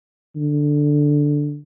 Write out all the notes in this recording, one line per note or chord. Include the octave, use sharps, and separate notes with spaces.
D3